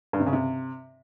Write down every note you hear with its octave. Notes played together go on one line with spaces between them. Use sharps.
G2
C3
C#3
C3